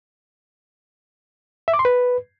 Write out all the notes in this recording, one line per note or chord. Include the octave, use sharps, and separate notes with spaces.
E5
D6
C6
B4